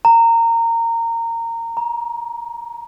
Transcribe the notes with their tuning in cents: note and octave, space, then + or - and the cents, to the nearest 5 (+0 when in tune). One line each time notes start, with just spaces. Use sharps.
A#5 -20
A#5 +25